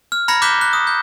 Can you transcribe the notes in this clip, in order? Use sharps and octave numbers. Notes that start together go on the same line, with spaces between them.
F6
A#5 B5 F6 G#6 A#6 C#7
D6 F#6 G6 B6 E7 G7
F#6
D#6
G6